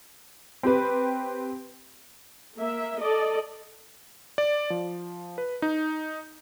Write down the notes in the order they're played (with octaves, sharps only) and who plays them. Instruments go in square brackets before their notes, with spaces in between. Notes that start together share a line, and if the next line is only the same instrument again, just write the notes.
[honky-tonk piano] C4 G4 B4
[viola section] A#3 E5
A4 D5 D#5
[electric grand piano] D5
F3
B4
D#4